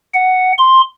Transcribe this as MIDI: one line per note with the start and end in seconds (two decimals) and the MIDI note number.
0.14 0.52 78
0.58 0.81 84